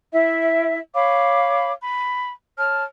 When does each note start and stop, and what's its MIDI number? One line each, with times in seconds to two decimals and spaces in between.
0.12 0.78 64
0.12 0.78 76
0.94 1.71 73
0.94 1.71 77
0.94 1.71 83
0.94 1.71 86
1.80 2.29 83
2.58 2.83 73
2.58 2.83 81
2.58 2.83 89